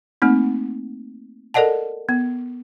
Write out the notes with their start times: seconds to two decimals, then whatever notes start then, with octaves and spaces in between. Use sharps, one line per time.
0.22 A3 A#3 C4 D#4
1.54 A4 A#4 D5 D#5 F#5 A5
2.09 B3